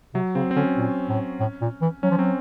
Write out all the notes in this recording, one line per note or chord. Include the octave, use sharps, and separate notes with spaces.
C3 F#3
C#3 C4
C4
D3 C#4
A#2
A2
A2
A#2
E3
F#3 C#4
F3
F#3 C4